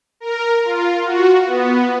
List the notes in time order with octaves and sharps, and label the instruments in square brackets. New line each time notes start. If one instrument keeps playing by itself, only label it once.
[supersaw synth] A#4
F4
F#4
B3